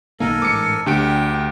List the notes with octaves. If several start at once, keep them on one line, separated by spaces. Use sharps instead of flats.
B1 D#3 A#3 A4 A#4 G#5
A1 G#2 D6 C#7
D2 D3 G4 G5 D7